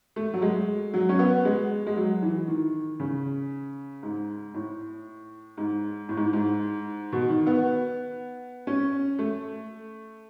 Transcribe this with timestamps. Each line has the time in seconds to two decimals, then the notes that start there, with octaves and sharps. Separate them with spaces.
0.16 A3
0.34 F#3
0.42 G#3
0.94 F#3
1.09 C#4
1.19 B3
1.45 G#3
1.87 G#3
1.97 F#3
2.22 E3
2.48 D#3
3.00 C#3
4.03 G#2
4.54 A2
5.57 G#2
6.09 A2
6.17 G#2
6.33 G#2
7.12 B2
7.29 D#3
7.47 B3
8.67 C#4
9.19 A3